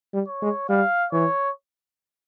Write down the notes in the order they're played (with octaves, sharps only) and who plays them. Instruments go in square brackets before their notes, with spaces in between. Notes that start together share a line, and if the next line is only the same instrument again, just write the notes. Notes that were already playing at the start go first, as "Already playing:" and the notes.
[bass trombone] G3
[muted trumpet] C#5
[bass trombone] G#3
[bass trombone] G3 [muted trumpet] F5
[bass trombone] E3 [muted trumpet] C#5